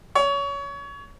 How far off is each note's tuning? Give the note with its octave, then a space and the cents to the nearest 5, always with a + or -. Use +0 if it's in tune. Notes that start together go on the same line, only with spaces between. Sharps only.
C#5 +25